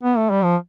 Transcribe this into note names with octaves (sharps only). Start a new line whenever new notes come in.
B3
A3
G3
F3